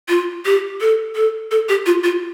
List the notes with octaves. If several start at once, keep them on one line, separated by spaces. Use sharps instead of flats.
F4
G4
A4
A4
A4
G4
F4
F4